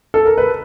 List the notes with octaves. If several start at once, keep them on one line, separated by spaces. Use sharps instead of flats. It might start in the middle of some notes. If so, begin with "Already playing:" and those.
A4
A#4
B4